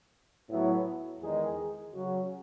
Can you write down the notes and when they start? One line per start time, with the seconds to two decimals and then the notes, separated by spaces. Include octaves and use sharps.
0.49 A2 F#3 B3 E4
1.21 E2 D#3 G#3 D#4 G#4
1.93 C#3 F#3 C#4 F#4